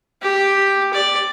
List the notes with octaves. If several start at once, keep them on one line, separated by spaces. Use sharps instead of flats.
G4
D5